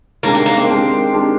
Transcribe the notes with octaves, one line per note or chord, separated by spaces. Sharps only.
D#3 G#3 A#3 D4 G4 A#4
A#3
A#3
C4
D#3 G#3 D4 G4 A#4
D#3 G#3 D4 G4 A#4